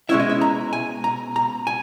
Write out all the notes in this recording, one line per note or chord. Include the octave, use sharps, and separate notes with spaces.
B2 G#3 C#4 E4 E5
D#5
E5
A#5
G#5
A#5
A#5
G#5